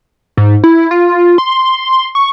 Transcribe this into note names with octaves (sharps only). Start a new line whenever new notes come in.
G#2
E4
F4
C6
C#6